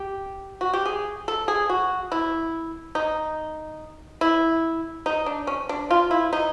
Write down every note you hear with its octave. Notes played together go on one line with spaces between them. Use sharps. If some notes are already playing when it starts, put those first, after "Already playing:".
Already playing: G4
F#4
G4
G#4
A4
G#4
F#4
E4
D#4
E4
D#4
D4
C#4
D4
F4
E4
D#4